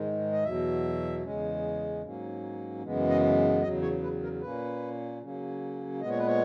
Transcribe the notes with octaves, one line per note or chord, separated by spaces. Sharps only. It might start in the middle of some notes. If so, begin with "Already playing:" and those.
Already playing: G#2 D#3 G#3
D#5
E2 B2 F#3 E5
E2 C#3 G#3 C#4
G#2 F#3 A#3 C#4
F#2 C#3 E3 G#3 B3
D#5
E2 C#3 F#3 D#5
C#5
B4
A#4
A#2 A#3 C#4 B4
C#3 F#3 A#3 C#4
A#2 G#3 B3 D#5
C#5
B4
C#5